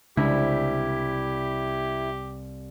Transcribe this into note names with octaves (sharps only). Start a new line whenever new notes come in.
C2 C#3 G#3 D4 E4 G4